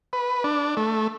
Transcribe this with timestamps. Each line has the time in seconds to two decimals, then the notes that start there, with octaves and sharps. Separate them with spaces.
0.13 B4
0.44 D4
0.77 A3